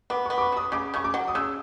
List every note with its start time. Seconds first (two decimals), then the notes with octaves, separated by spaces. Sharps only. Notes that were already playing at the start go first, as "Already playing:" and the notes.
0.10 B3 D6
0.25 B3 C#6
0.38 D6
0.41 C#6
0.52 F#3 D#6
0.72 C#3 D6
0.94 C#3 C#6
1.04 D6
1.14 F#3
1.28 D#6
1.35 C#3 E6